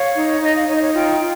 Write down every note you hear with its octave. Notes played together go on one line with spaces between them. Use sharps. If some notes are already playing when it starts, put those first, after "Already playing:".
Already playing: C#5 F5
D#4
D#4 D#5
F5
D#4 C#5
D#5
C#5
F4 G5
F4